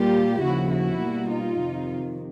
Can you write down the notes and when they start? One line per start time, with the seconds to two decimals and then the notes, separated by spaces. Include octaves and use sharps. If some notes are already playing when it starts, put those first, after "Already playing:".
Already playing: A#2 G3 A#3 F4 G4
0.41 D#2 C#3 F3 E4 F#4
0.71 E4 F#4
1.00 B2 G3 A#3
1.30 D#4 F4
1.60 F2 C3 D#3